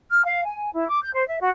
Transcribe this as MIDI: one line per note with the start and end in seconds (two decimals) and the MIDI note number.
0.10 0.25 89
0.25 0.43 77
0.45 0.70 80
0.73 0.86 64
0.90 1.00 86
1.02 1.10 91
1.14 1.26 72
1.27 1.38 76
1.40 1.49 66